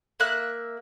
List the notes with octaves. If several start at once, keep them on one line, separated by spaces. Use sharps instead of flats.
A#3 E5 F#6